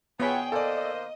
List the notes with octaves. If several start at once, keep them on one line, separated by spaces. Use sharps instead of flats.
B3 F4 G#4 C#5 E5 F#5 G5 B5
D#3 A#3 A4 C5 D5 D#5